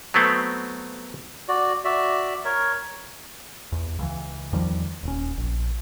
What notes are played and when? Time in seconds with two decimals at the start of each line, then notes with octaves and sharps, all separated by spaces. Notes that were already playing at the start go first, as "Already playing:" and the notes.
0.14 F#3 A3 B3 C4
1.48 F#4 D5
1.85 F#4 D5 E5
2.45 A#4 C#5
3.72 E2
3.99 C#2 E3
4.53 E2 D#3 F3 G3
5.03 D#1 C#4
5.37 A#1